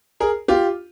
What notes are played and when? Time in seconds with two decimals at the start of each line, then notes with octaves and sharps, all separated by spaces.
0.20 G#4 A#4
0.48 F4 G4